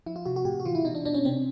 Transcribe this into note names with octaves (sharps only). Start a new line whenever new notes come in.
F3 E4
F4
C3 F#4
F#4
A2 G4
F#4
E3 F4
E4
B2 D#4
D4
B2 D4
C#4
C3 C4